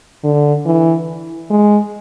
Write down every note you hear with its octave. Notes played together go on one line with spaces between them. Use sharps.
D3
E3
G#3